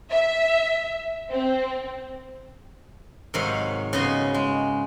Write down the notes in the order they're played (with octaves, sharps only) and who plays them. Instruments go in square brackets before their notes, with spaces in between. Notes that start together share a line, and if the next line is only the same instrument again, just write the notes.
[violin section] E5
C4
[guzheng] G#2 C3 D#3 F#3 F5 B5
C#3 B3 F#4 D#5 C6
G#3